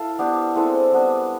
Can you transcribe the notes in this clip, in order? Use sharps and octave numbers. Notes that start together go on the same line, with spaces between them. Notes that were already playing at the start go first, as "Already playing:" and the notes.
Already playing: E4 A4 F5
B3 D4 G4
G#3 C4 E4 A4
G3 B3 D4